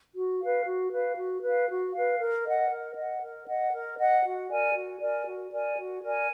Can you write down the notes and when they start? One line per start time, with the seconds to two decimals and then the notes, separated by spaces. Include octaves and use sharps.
0.15 F#4
0.40 B4 F5
0.66 F#4
0.91 B4 F5
1.17 F#4
1.43 B4 F5
1.68 F#4
1.94 B4 F5
2.19 A#4
2.45 D#5 F#5
2.70 A#4
2.95 D#5 F#5
3.21 A#4
3.46 D#5 F#5
3.73 A#4
3.98 D#5 F#5
4.24 F#4
4.49 A#4 D5 G#5
4.75 F#4
5.00 A#4 D5 G#5
5.26 F#4
5.51 A#4 D5 G#5
5.77 F#4
6.02 A#4 D5 G#5